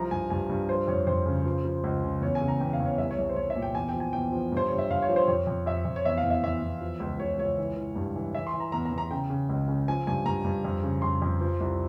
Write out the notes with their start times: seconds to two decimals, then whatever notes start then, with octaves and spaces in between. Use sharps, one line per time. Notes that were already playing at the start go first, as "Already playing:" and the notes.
Already playing: C2 F3 A#5
0.11 G2 G#5
0.30 G2 G#5
0.50 G2
0.69 F3 C5
0.88 F2 C#5
1.07 F2 C5
1.26 C#3
1.45 F3
1.65 F3
1.84 C#2
2.03 C#3
2.21 E2 C#5
2.35 G#5
2.41 C#3
2.48 A#5
2.60 E2 G5
2.73 F5
2.80 E2
2.85 C#5
2.98 C2 E5
3.11 C#5
3.18 C2
3.29 C5
3.36 C2 C#5
3.50 E5
3.55 A#2
3.62 G5
3.75 E2 G#5
3.89 G5
3.94 F3
4.00 G#5
4.13 E2 G5
4.32 F3
4.52 G2 C5
4.68 G2 C#5
4.79 E5
4.90 G2 F5
5.02 C#5
5.09 F3
5.16 C5
5.28 F2 C#5
5.47 F2
5.66 F2 E5
5.85 F2
5.96 C#5
6.05 E2 E5
6.17 F5
6.24 E2
6.30 E5
6.43 E2 E5
6.62 E2
6.81 F3
7.00 C#2
7.19 C#2 C#5
7.39 C#2 C#5
7.58 E3
7.77 E3
7.96 G2
8.16 E3
8.34 E3 E5
8.47 C6
8.54 E3
8.60 A#5
8.72 E2 A#5
8.85 A#5
8.91 E2
8.98 A#5
9.11 C#3 G5
9.30 C#3
9.49 C#2
9.68 C#3
9.88 F3 G#5
10.07 G2 G#5
10.26 G2 A#5
10.45 G2
10.65 F2
10.83 C#3
11.02 F2 C6
11.22 F2
11.41 F3
11.60 C2